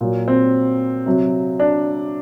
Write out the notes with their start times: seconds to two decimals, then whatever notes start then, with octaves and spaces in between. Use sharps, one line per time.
0.01 A#2 F#3
0.28 C4
1.06 C3 F#3
1.60 D4